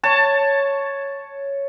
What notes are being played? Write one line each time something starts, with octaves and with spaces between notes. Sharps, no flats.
C#5 A5